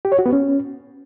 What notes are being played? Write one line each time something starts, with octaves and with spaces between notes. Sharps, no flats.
G4
C#5
F#4
B3
C#4